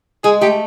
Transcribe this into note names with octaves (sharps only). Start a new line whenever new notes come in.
G#3 G#4
A3 G4